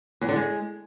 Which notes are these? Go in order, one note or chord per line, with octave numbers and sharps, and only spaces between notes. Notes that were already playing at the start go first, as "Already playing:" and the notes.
E2
D3
G#3